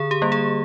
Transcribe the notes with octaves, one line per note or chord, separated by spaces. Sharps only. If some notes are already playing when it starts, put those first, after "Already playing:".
Already playing: D3 G#4
G4
G3 A#3
G#4